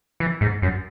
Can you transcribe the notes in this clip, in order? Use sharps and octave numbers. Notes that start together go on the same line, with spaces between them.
E3
G#2
F#2